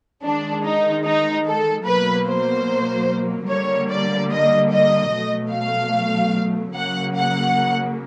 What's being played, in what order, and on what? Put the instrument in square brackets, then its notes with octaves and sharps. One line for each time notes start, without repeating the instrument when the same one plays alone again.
[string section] D#3 G#3 D4
D#4
D#4
A4
B2 F#3 A#3 B4
C5
D3 G3 A#3 C#5
D5
D#5
D#5
B2 F#3 A3
F5
C#3 F#3 A#3 F#5
F#5